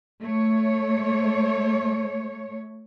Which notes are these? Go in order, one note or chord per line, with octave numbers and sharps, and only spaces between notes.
A3 C#5